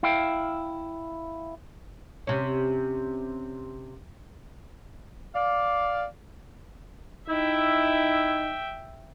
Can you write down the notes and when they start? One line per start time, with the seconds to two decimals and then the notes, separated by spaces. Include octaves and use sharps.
0.03 E4 F5 G5
2.27 C3 C#4
5.35 D5 F5
7.29 D#4 E4 E5 G5